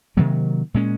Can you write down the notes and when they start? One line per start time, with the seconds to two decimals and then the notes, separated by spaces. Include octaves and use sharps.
0.17 C3 D#3 F#3 A#3
0.74 A#2 G#3 C#4